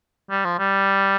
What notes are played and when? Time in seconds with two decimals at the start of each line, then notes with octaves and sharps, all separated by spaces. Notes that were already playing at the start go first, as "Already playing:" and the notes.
0.31 G3
0.45 F3
0.59 G3